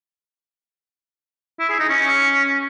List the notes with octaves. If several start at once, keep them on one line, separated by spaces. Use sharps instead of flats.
E4
G#4
D#4
C#4